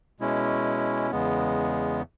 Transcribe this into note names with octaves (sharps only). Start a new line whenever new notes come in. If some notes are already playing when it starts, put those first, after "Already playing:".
B2 G#3 C#4 E4
E2 C#3 G#3 B3